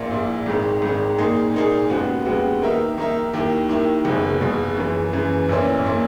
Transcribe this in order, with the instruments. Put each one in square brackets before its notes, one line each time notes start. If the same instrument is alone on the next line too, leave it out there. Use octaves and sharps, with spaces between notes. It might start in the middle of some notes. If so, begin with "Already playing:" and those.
Already playing: [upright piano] A#1 A#2 A#3 E4
A#1 A#2 A#3 E4
G#1 G#2 D#3
G#1 G#2 D#3
A#2 A#3 D#4 G#4
A#2 A#3 D#4 G#4
D#2 C#3 G#3 B3 F#4
D#2 C#3 G#3 B3 F#4
D#3 A#3 D#4 A#4 E5
D#3 A#3 D#4 A#4 E5
D#2 D#3 A#3 E4
D#2 D#3 A#3 E4
F#1 E2 B2
F#1 E2 B2
F#2 C#3 E3
F#2 C#3 E3
B1 A#2 A#3 C#4 E4
A#2 A#3 C#4 E4